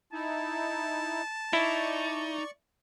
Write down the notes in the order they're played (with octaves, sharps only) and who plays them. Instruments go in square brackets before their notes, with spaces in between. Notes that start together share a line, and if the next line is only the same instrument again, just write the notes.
[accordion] D#4 E4 [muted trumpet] A5
[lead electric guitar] D#4 [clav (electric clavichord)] E4 [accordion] D5 C#6